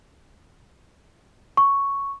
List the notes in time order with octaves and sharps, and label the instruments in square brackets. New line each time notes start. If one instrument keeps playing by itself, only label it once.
[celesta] C#6